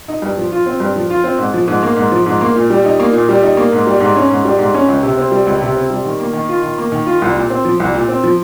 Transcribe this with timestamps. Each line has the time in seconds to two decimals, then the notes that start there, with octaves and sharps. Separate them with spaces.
0.08 D#4
0.22 G2
0.37 F3
0.52 F4
0.66 C4
0.80 G2
0.96 F3
1.10 F4
1.24 C4
1.38 G#2
1.54 F3
1.68 G#2
1.83 A#3
1.96 G#2
2.12 F3
2.26 G#2
2.41 A#3
2.56 A#2
2.70 G3
2.85 D#4
3.00 A#3
3.13 A#2
3.29 G3
3.43 D#4
3.57 A#3
3.72 G#2
3.87 G3
4.00 G#2
4.16 C#4
4.30 G#2
4.45 G3
4.59 G#2
4.74 C#4
4.88 C#2
5.03 C3
5.17 C4
5.31 G3
5.46 C#2
5.61 C3
5.75 C4
5.90 G3
6.05 D#3
6.20 A#3
6.33 D#3
6.49 F4
6.63 D#3
6.78 A#3
6.92 D#3
7.06 F4
7.22 C2
7.36 A#2
7.50 C4
7.65 F3
7.80 C2
7.94 A#2
8.08 C4
8.23 F3